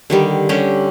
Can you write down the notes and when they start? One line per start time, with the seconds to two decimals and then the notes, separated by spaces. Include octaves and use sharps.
0.10 D3 D#3 G3
0.49 D3 G3 C#4 G4